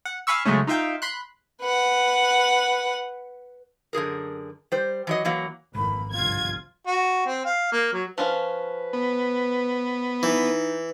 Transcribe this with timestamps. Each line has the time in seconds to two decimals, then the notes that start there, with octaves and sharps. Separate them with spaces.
0.05 F#5
0.27 F5 G#5 B5 C#6 E6
0.45 C#3 F#3 G#3 A3 C#4
0.67 D#4 F4 E5 F5 G5
1.02 B5 C6 F#6
1.61 B4 F#5
3.93 F#2 D3 G#4 A#4
4.72 G3 C5
5.07 E3 F#3 D#5
5.25 E3 F#3 A#3
5.75 G#1 F2 E3 A#3 B5
6.13 G1 C2 F2 F4 G#6
6.87 F#4
7.26 C4
7.45 F5
7.72 A#3
7.93 F#3
8.18 F3 C#4 F4 B4
8.93 B3
10.23 E3 D#4